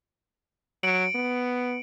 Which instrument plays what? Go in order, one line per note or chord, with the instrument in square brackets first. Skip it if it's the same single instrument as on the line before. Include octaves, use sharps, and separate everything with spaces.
[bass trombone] F#3 [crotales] C#7 D7 F#7
[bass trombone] B3